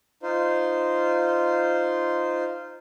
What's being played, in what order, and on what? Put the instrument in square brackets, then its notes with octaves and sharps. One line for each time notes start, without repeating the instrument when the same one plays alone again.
[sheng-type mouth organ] D#4 F4 C5